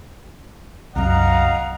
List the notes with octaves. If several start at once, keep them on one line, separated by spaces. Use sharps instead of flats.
C2 F#2 D#5 F5 F#5 A#5